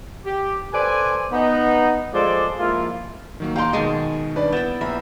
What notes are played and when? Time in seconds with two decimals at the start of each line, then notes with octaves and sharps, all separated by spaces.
0.24 G4
0.72 A4 B4 C5 D5 G#5
1.32 B3 D#4
2.13 F3 G#3 A4 C5 D5
2.57 F3 G#3 A#3 E4 F4
3.40 D#3 F#3 A#3
3.56 G4 F5 G5 A#5 C6
3.73 B2 D#3 G#3 D#5 G#5 A5
4.35 D4 B4 D5
4.52 B3 E4 G5 G6 A6 E7
4.81 A#1 E5 A#5 B5